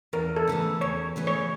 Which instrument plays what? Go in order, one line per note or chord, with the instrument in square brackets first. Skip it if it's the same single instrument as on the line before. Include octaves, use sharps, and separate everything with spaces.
[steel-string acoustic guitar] E2 [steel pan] A#4
[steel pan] A4
[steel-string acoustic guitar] C#3 E3 A3
[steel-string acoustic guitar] E2 [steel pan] C#5
[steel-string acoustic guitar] C#3 E3 A3
[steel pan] C#5